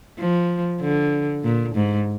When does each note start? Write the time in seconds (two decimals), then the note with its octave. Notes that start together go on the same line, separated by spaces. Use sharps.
0.19 F3
0.81 D3
1.44 A#2
1.75 G#2